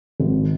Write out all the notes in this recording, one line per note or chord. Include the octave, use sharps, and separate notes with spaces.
G#1